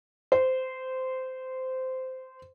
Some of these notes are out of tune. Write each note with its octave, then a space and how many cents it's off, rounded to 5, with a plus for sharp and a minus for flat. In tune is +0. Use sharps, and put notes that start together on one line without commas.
C5 -15